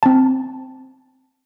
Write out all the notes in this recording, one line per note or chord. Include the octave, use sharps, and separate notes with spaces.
C4 A5